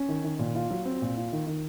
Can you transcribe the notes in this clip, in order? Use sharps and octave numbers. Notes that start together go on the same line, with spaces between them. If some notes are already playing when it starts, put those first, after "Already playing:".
Already playing: C#4
D#3
D#3
A#2
F4
F#3
C4
A#2
F4
D#3
D#3